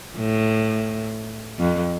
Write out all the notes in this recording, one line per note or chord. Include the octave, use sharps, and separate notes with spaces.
A2
F2